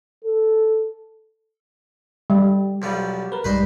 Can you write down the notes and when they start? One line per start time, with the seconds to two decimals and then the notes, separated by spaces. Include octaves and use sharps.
0.24 A4
2.30 G3
2.82 B1 F3 G3
3.32 A#4 B4
3.44 B1 G#2 G3 B4 C5 D#5